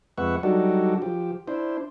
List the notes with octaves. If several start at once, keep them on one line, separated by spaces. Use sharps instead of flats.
F2 G#3 B4 E5 F#5 C#6
F#3 G3 D4 D#4 F#4 A4
F3 G4
D4 E4 C5